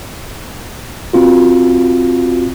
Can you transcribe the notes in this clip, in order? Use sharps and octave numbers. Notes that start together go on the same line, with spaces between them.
C4 F4 F#4